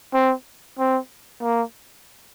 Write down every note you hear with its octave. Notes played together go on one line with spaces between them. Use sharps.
C4
C4
A#3